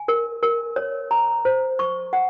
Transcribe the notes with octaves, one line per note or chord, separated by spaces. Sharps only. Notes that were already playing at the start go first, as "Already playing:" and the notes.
Already playing: G#5
A#4
A#4
C#5
A#5
C5
C#6
F#5